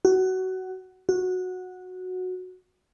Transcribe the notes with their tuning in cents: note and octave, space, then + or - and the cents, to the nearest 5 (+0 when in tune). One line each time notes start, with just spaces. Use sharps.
F#4 +20
F#4 -10